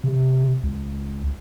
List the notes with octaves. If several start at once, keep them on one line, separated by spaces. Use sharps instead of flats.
C3
C#2